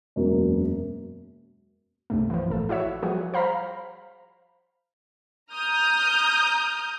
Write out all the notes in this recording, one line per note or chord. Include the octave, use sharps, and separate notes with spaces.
E1 F#2 A#3
C2 G2 A3
E3 F3
A1 A4
E4 F#4 C#5 E5
F3 G3 F#4 G#4
C5 F5 A#5 B5
A#5 D#6 F6 G6